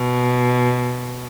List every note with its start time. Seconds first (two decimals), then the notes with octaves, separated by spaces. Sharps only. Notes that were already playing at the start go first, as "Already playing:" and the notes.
Already playing: B2